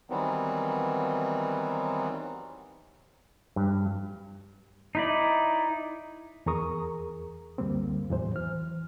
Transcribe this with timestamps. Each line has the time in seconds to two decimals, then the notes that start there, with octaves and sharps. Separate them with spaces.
0.10 D#3 E3 F#3 G3 B3 C4
3.56 G2
4.95 D#4 E4 D5
6.46 E2 G#4 A#4 A#5 C#6 D#6
7.58 C#2 F#2 D3 G3 A#3 C4
8.10 E2 A2 E3 F#3 C5
8.36 E3 F6